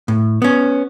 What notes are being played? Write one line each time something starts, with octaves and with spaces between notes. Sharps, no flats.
A2
B3 C#4